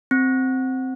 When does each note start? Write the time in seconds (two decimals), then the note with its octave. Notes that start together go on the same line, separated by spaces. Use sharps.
0.11 C4